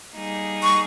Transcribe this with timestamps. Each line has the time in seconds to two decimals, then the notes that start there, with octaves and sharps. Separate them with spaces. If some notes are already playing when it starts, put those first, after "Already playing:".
0.14 G3 A#3 D#4 G#4
0.63 C#6